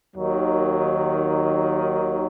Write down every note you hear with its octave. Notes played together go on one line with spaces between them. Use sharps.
D#2 D#3 F#3